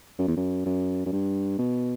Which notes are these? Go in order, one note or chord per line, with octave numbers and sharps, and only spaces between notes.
F#2
E2
F#2
F#2
F#2
G2
B2